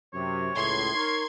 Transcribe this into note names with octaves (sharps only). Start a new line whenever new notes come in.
F#2 C3 C#5
C#2 A2 C6 G#6
D#4 A#4 C#5